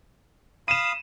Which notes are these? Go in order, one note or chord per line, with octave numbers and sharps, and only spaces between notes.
F5 B5 D#6 D#7 E7